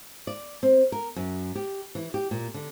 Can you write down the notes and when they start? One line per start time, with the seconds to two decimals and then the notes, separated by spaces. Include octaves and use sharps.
0.27 D5
0.63 C4
0.92 A#4
1.16 F#2
1.55 G4
1.95 E3
2.14 G4
2.31 A#2
2.54 D3